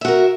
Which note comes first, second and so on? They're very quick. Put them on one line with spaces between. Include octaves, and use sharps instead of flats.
E5 F#4 A#4